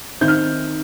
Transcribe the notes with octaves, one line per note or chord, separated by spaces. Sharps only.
D#3 C4 D#4 G6
F6